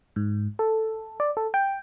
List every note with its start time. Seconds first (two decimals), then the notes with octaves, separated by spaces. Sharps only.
0.16 G#2
0.59 A4
1.20 D5
1.37 A4
1.54 G5